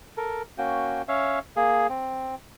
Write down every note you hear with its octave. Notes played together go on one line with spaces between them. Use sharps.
A4 A#4
A#3 C#4 F#4 G5
C#4 C#5 E5 F5
A#3 G#4
C4